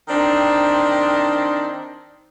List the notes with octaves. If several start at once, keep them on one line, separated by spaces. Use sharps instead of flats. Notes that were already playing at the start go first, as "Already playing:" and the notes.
D#3 C4 D4 C5